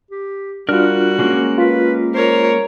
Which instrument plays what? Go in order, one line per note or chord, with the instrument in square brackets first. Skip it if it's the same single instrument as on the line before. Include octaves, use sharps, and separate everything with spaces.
[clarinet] G4
[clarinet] G3 [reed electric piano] D4 F4 [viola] F#4 [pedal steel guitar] A#4 F6 F#6
[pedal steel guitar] G#3 A#3 C#4
[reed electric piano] F4 [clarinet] B4
[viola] A#4 C#5 [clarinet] C5